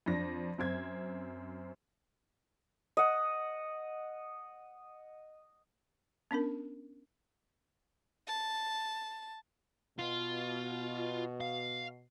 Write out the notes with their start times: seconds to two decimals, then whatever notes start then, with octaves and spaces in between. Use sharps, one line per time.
0.06 F2 D4 A#6
0.58 F#2 C4 G#6
2.97 D#5 F#5
6.31 B3 C#4 D4 A#4
8.27 A5
9.99 B2 F4
11.41 F5